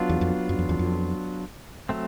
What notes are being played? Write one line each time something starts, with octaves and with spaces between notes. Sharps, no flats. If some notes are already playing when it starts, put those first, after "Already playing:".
Already playing: F#3 B3 D4 F4
E2
F2
F#2
F2
E2
F2
F#3 A3 C4